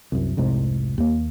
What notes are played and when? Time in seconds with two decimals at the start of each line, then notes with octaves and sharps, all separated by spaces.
0.12 C2 F#2
0.37 F1 C2 G#2 C3
0.98 D#2 A#3